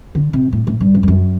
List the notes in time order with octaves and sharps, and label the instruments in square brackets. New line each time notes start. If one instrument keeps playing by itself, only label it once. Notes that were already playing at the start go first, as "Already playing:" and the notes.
[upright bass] D3
C3
A2
A2
G2
F#2
G2
F#2